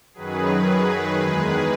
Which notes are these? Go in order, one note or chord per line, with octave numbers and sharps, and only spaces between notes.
F#2 D#3 F#3 G#4 B4
G#4 B4
E2 D#3 G#3